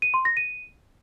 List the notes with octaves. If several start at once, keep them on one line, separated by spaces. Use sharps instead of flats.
D#7
C6
A#6
D#7